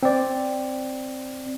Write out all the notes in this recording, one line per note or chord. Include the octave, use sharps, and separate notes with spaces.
C4 D5